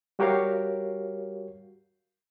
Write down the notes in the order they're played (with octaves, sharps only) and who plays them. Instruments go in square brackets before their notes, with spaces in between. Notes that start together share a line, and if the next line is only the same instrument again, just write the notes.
[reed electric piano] G3 F#4 G4 A#4 C#5 F5